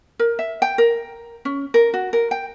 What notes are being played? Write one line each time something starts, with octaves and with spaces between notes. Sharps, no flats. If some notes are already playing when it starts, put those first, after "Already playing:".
A#4
E5
G5
A#4
C#4
A#4
F#4
A#4
G5